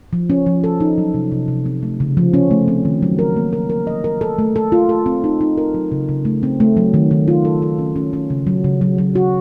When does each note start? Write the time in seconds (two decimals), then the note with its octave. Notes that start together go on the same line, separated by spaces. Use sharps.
0.13 F3
0.30 C#4
0.46 F3
0.64 A4
0.80 D#4
0.98 F#3
1.14 C3
1.32 C3
1.48 C3
1.66 C4
1.83 A3
2.00 C#3
2.17 F3
2.34 C#4
2.51 A3
2.68 C4
2.85 D#3
3.02 F#3
3.19 A#4
3.36 A#3
3.53 A#4
3.70 A#4
3.87 D#5
4.04 A#4
4.21 A4
4.38 A3
4.56 A4
4.72 F4
4.89 A4
5.06 C4
5.24 D#4
5.41 D#4
5.57 A#4
5.74 F#3
5.92 C#3
6.09 C#3
6.25 A3
6.43 C4
6.60 A3
6.77 F#3
6.94 D#3
7.11 D#3
7.28 F4
7.45 A4
7.62 A4
7.79 C#4
7.96 C#4
8.13 C#4
8.30 C#3
8.47 F#3
8.64 C#3
8.81 F#3
8.98 F#3
9.15 F#4